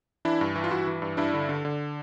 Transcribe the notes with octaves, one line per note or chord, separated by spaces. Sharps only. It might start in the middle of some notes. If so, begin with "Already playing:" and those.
E3 D4 E4
G2
E3
F4
G2 E4 F#4
E3
G2
G2 D4 E4
D3
D3
D3